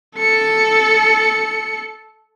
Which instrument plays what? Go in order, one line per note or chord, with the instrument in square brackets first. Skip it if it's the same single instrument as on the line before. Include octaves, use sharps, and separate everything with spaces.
[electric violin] A4 C#7